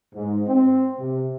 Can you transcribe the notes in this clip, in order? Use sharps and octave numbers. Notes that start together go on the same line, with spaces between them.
G#2
C4
C3